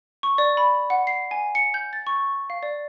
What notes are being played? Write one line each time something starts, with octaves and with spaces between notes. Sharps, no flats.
C#6
D5
B5
F#5
C7
G#5
C#7
G6
A6
C#6
F5
D5